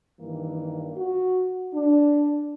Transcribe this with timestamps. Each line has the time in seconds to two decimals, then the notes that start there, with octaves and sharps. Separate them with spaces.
0.19 G2 D#3 E3 A#3
0.97 F#4
1.74 D4